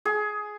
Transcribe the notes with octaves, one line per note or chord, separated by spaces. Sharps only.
G#4